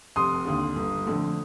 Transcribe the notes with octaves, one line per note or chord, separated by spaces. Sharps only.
F1 C6 D#6
D#2 D3
G1
F2 D3 A3